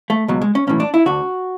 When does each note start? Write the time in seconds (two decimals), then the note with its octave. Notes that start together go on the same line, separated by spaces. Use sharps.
0.10 A3
0.28 C#2 B2 F#3
0.42 G#3
0.55 C#4
0.67 B1 A2 E3 C#4
0.80 D4
0.94 E4
1.06 D2 D3 F#4